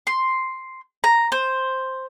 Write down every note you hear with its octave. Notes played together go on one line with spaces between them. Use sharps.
C6
A#5
C5